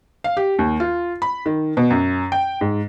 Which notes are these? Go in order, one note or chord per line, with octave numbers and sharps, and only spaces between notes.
F5
G4
D#2
F4
B5
D#3
B2
F#2
G5
G#2